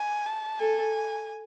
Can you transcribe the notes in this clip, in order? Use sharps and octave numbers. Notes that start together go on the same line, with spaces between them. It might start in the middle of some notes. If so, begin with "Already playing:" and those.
Already playing: G#5
A5
A4 G#5